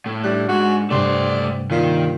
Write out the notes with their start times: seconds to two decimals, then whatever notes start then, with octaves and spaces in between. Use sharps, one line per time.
0.06 A2
0.24 G3 D4 F#6
0.49 G#2 F#4
0.91 G2 C3 A3 C5 D5
1.71 A#2 D#3